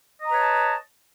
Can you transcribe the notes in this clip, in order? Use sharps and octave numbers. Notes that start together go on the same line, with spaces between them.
B4 C#5 D#5 A5 A#5